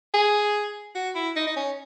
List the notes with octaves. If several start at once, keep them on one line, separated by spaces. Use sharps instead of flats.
G#4
F#4
E4
D#4
D#4
C#4